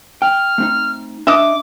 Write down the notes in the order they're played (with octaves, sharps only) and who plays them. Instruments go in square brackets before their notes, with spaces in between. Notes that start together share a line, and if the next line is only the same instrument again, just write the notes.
[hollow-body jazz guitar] G5 [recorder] F6
[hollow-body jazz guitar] A3 C4 D#4
[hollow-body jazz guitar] D4 [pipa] D#5 E5 [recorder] D6